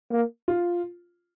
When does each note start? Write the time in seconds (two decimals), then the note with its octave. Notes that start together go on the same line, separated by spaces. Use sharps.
0.12 A#3
0.48 F4